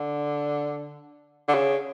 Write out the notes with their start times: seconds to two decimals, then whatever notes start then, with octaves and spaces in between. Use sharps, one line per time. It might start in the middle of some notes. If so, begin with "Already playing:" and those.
Already playing: D3
1.48 D3
1.54 C#3